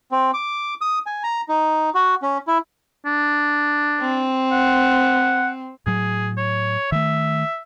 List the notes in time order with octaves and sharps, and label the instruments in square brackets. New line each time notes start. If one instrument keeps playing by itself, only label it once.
[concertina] C4
D6
D#6
G#5
A#5
D#4
F#4
C#4
E4
[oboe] D4
[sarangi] C4
[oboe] F#5
[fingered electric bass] A2 F#3 [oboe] G#4
[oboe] C#5
[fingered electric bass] D#3 A3 [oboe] E5